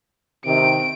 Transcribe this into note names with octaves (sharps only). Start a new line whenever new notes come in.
C3 D#3 D7